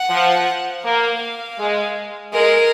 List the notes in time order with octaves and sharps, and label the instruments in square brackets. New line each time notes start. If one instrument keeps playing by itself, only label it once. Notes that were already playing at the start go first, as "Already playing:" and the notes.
Already playing: [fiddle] F#5
[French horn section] F3
[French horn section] A#3 [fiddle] F5
[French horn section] G#3
[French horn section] G#3 [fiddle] A#4